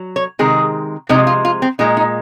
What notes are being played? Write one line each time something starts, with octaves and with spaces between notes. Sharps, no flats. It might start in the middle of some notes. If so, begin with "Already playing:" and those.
Already playing: F#3
C#5
C3 D#3 G#3 G#4
C3 F3 G#3 D#4
F4
F4
C4
A#2 G#3 D#4
D#4